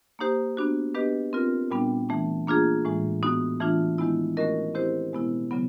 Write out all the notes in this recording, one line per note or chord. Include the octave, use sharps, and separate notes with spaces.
A#3 D#4 G4 C5
B3 D4 F#4
B3 D4 G4 B4 D#5
C4 F4 A#4
A#2 G3 B3 D4
E3 A3 D4
A#3 D4 F4 G#4
A2 E3 G#3
B3 D#4 F#4
E3 A3 D4 F4
D#3 G#3 B3 E4
A3 C#4 F#4 A#4 D#5
C4 E4 G4 C5
B2 G#3 B3 E4
C#3 F#3 B3